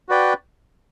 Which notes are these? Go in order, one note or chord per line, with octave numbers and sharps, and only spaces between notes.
F#4 B4 D5 G5